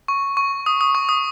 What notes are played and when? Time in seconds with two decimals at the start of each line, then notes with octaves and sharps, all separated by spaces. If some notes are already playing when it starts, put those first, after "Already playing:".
0.08 C#6
0.37 C#6
0.66 D#6
0.81 D#6
0.95 C#6
1.09 D#6